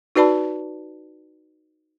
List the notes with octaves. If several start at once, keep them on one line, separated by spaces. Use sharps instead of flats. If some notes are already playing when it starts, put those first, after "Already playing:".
D#4 F#4 B4 D5 A5 B5